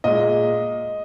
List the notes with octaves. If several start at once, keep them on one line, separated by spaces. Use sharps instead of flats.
A#2 G#3 D#5